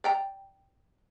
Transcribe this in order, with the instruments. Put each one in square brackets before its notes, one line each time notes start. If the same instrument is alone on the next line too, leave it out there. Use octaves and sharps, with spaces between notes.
[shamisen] D5 G5 A#5